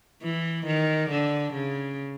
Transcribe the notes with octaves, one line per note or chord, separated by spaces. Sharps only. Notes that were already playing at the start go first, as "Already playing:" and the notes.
E3
D#3
D3
C#3